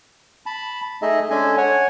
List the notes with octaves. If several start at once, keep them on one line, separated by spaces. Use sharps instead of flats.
A5 B5
A3 D#4 G#4 D#5 E5
G#3 C#4 D4 A4 G#5
C#5 F#5 G#5